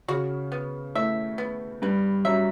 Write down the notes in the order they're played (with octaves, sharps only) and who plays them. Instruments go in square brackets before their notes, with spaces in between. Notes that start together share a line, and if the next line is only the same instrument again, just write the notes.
[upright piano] C#3 C#4 [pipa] F#4
[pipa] B3
[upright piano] A2 A3 [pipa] E5
[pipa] B3
[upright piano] G2 G3 [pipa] B4
[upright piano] F#2 F#3 [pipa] E5